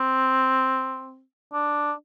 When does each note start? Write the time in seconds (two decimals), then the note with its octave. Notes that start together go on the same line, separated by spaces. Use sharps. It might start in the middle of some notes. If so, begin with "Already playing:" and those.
Already playing: C4
1.53 D4